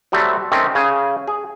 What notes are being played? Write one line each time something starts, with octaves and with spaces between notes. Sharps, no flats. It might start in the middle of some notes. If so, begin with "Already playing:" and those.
F#3 G3 A3 C4
D#3 A3 C4 C#4
C#3 G#4 G#5
G#4